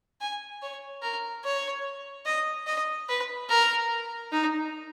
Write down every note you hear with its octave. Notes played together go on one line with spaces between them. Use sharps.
G#5
C#5
A#4
C#5
D#5
D#5
B4
A#4
D#4